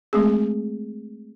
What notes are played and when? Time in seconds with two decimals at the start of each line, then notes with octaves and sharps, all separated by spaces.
0.13 G#3 A3 C4 G#4